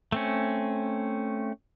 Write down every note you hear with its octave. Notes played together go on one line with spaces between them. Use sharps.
A3 C4 C#4